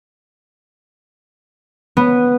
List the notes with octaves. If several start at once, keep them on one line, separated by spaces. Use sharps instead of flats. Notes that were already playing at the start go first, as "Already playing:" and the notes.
B3